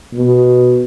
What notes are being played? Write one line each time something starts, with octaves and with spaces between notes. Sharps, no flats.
B2